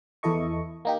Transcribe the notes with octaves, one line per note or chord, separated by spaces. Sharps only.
E2 E3 E4 A4 D#5 C#6
A#3 D#4 G4